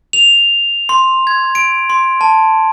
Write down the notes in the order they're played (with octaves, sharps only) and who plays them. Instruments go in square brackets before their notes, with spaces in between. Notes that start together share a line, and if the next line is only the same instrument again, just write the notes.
[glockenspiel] F7
C6
G#6
D7
C6
A5